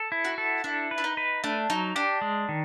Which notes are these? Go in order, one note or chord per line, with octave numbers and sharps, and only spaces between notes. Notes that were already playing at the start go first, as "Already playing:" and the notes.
Already playing: A4
E4
F#4
A4
D4 E4
B4
E4
D#4
B4
A3 D4
F#3 D#4
D4 G4
G#3
D#3